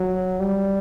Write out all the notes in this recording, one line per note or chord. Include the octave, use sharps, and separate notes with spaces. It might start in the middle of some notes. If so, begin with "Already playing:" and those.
Already playing: F#3
G3